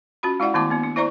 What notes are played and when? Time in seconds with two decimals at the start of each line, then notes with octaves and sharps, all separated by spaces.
0.23 C#4 F4 F#4 B5
0.40 G#3 E4 D5 E5 F#5
0.54 D#3 A3 B3 E4 A5 D6
0.70 A#3 B3 D4
0.83 D4
0.96 E4 C5 D5 E5 A#5 C#6